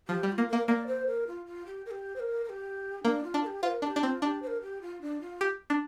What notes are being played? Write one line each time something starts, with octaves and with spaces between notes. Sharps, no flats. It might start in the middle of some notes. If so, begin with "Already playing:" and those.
F3 G4
G3
G4
F4
A#3
A#3 A#4
A#3 D5
C5
A#4
F4
F4
G4
A#4
G4
C5
A#4
A#4
G4
A#3 D4
F4
D4
A#4
G4
F4 C5
A#4
D4 A#4
G4
D4
C4 F4
D4 G4
C5
A#4
G4
F4
D4
F4
G4
D4